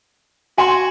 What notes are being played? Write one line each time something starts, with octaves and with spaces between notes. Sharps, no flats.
F#4 G#5 C6